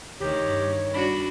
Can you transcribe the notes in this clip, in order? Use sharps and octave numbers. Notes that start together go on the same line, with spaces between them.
D2 D#3 G4 C#5
G2
D4 F#4 B5